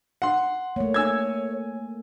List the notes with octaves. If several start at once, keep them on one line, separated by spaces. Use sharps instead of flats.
F#5 C6
A3 A#3 C#5
G#5 E6 G#6